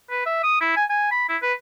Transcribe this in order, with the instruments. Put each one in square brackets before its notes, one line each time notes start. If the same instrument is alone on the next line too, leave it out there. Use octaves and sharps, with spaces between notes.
[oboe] B4
E5
D#6
E4
G#5
G#5
B5
E4
B4